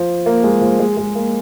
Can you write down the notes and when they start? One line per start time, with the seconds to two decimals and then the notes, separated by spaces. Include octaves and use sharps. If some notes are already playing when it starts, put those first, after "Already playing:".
Already playing: F3
0.26 A#3
0.44 G#3
0.61 F3
0.79 G#3
0.97 G#3
1.15 A#3